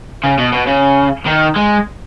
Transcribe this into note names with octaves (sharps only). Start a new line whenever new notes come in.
C#3
B2
B2
C#3
D#3
G#3